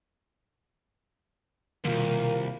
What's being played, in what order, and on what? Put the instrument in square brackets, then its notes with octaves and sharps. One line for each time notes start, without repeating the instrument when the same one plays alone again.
[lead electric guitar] C2 F#2 [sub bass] B2 [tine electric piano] D#3 F4 [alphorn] A#3